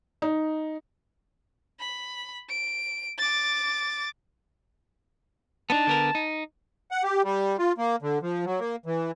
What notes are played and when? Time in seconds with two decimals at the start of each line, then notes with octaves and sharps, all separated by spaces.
0.22 D#4
1.80 B5
2.49 D7
3.18 D6 A6
5.70 B3 D4 D#4 A5
5.87 D3 B3 A#4
6.15 D#4
6.91 F#5
7.03 G4
7.24 G3
7.58 F4
7.78 A#3
8.02 D3
8.22 F3
8.45 F#3
8.60 A#3
8.86 E3